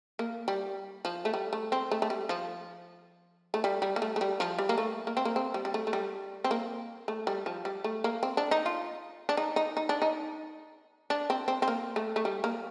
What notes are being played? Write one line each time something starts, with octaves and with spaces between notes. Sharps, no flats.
A#3
G3
F3
A3
G3
A3
C4
A3
A3
G3
F3
A3
G3
G3
A#3
A3
A3
G3
F3
G3
A#3
A3
A#3
C4
A#3
C4
G3
G3
A3
A3
G3
C4
A#3
A3
G3
F3
G3
A3
A#3
C4
D4
D#4
F4
D4
D#4
D#4
D#4
D4
D#4
D4
C4
C4
C4
A#3
A3
A3
G3
A#3